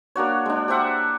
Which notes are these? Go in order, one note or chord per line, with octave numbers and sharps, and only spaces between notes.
A#3 D4 F#4 C#5
G#3 D4
G4 C5 E5 F#5